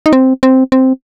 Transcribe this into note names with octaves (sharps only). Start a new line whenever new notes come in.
D#4
C4
C4
C4